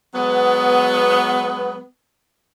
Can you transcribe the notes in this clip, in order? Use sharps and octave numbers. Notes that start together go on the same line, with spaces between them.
F#3 G#3 B3